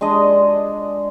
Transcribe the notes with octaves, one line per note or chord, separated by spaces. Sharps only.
G#3 D4 D#5